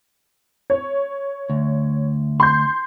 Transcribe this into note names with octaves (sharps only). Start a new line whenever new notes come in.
C#5
D2
C6 G6